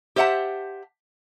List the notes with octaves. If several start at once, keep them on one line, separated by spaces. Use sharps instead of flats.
G4 C5 E5 F#5 A5